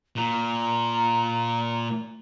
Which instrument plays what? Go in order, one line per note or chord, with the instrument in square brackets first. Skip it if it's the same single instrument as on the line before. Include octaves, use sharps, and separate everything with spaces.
[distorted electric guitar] A#2 [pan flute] A#5